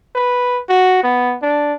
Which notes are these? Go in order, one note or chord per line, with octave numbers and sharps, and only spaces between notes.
B4
F#4
B3
D4